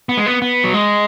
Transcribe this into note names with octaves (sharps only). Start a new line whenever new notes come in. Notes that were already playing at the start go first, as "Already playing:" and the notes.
B3
G#3
B3
B3
F#3
G#3